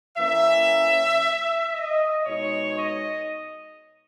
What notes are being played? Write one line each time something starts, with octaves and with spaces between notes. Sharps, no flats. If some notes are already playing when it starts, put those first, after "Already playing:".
E3 A#3 C#4 E5
D#5
B2 G#3 D#4 C#5
D#5